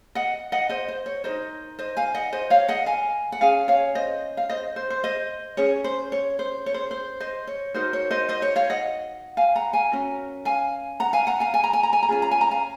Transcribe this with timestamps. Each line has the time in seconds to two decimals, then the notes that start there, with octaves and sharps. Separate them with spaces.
0.15 D#5 F#5
0.52 D#5 F#5
0.69 C5 D#5
0.88 C5
1.06 C#5
1.24 D#4 F#4 A#4 C5 D#5
1.79 C5 D#5
1.97 F5 G#5
2.14 D#5 F#5
2.33 C5 D#5
2.50 C#5 F5
2.68 D#5 F#5
2.86 F5 G#5
3.32 F#5
3.41 C#4 G#4 F5 G#5
3.68 C#5 F5
3.95 C5 D#5
4.37 F5
4.49 C5 D#5
4.76 C5
4.90 C5
5.04 C5 D#5
5.57 C#4 G#4 C#5
5.84 C5
6.12 C#5
6.39 C5
6.66 C#5
6.74 C5
6.91 C5
7.20 C5 D#5
7.47 C#5
7.74 D#4 F#4 A#4 C5 D#5
7.93 C#5
8.11 C5 D#5
8.29 C5 D#5
8.42 C#5
8.56 C#5 F5
8.70 D#5 F#5
9.37 F5 G#5
9.55 F#5 A#5
9.73 F5 G#5
9.92 C#4 F#4 A#4
10.45 F5 G#5
11.00 F#5 A#5
11.13 F5 G#5
11.27 F#5 A#5
11.40 F5 G#5
11.54 G#5
11.64 A#5
11.73 G#5
11.83 A#5
11.93 G#5
12.03 A#5
12.09 C#4 F4 G#4 G#5
12.22 A#5
12.31 G#5
12.41 A#5
12.51 F5 G#5